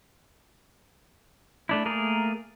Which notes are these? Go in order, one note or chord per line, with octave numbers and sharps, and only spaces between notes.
A3 D4 E4
A3 A#3 G#4 A#4